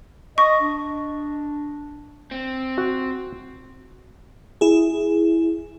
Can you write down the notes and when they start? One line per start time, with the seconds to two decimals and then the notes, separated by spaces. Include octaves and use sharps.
0.38 D#5 C#6
0.61 D4
2.31 C4
2.78 F#4 F#5
4.61 E4 G#4